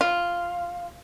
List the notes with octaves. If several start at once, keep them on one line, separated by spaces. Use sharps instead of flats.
F4